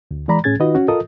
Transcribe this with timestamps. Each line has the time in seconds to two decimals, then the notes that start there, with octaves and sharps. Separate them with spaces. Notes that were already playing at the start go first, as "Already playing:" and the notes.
0.11 D2
0.28 E3 G#3 D5 A#5 B5
0.44 A2 C#4 G#4 G#6 A6
0.60 D#3 D#4 F4 F#4 B4 D#5
0.75 C#4 F#4
0.88 F4 A4 A#4 D#5 D#6